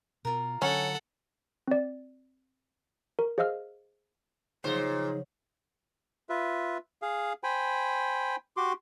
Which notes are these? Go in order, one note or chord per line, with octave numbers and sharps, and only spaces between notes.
B2 F4 A#4
D3 F#3 C#4 A4 F#5
C4 D5
A#4
G#4 C5 D#5 F5 E6 F6
A#2 C#3 F3 F#3 D#4 G#4 C5
F4 B4 E5
G#4 F5
C5 G5 G#5 B5
F#4 G4 C6 D6